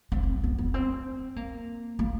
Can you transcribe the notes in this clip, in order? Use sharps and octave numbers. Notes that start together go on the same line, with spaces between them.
C4
C4
B3
B3
C4
A#3
A#3